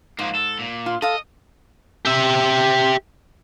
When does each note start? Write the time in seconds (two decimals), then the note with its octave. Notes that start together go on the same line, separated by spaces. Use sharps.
0.19 G#2 F3 A#3
0.35 A4
0.59 A#2
0.86 F4
1.02 A4 D#5 F5
2.06 G4 E5